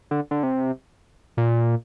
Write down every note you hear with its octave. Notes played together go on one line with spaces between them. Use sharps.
D3
D3
C3
A#2